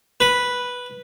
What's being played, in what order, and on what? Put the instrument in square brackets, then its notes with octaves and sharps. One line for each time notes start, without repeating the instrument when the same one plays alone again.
[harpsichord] B4